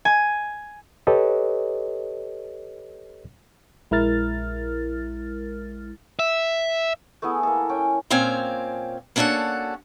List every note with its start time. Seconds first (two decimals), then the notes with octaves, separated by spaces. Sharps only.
0.05 G#5
1.07 G4 A4 B4 C#5 D#5
3.91 A#1 G#3 E4 A#4 F6 A6
6.19 E5
7.22 A3 B3 E4 G#4
7.43 A#3 A4
7.69 C#4 G5 G#5
8.10 A#2 C4 C#4 F5 G5 G#5
9.16 A#3 C#4 D4 F#4 A4 F#5